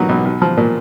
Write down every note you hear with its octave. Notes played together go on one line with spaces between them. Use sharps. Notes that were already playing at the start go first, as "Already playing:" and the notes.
Already playing: A#2 F#3 B3 D#4
B1
B1
F3
A#2